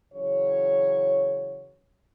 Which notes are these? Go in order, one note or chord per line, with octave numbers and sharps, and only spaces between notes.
C#3 E3 F#3 C#5